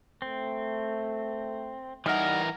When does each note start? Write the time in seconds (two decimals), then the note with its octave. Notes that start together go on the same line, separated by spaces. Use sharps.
0.22 A3 C4
2.06 E3 G3 D#4 A#4 F#5 F6